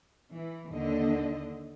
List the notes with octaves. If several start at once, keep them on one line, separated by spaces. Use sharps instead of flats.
E3
D#2 D3 D#5